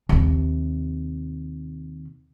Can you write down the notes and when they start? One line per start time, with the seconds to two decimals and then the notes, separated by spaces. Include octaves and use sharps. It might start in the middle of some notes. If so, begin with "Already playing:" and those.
0.09 D#2 C3